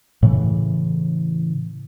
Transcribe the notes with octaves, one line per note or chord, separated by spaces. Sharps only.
A2 C#3 E3